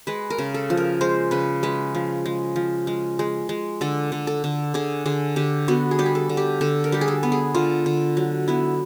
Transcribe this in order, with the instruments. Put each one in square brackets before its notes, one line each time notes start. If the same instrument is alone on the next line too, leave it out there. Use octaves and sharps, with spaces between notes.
[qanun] G#3 B4
A#4
C#3
A4
F3
A#4
G#3 C5
C#3 B4
G#3 B4
F3
G#3
F3
G#3
G#3
G#3
D3 A4
D3
A4
D3
D3 G#4
D3 G#4
D3 G4
B3 F#4
G#4
G3 G4
G#4
A4
D3
G4
D3 A4
A#4
G3 G4
G#4
A4
B3
G#4
D3 F4
D3
F#3
B3 E4